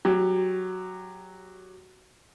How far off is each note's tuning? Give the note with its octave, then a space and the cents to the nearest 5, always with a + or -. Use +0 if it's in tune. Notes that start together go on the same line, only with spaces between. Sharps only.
F#3 +0 G4 +20